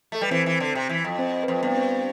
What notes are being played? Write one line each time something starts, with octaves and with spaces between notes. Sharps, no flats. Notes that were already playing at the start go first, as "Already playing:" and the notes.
A3 A4
G3 B4
E3 C4 C5
E3
D3
C3
E3
F2
C4 C5
B4
F2 C4 C5
G2 B3 B4
C4 C5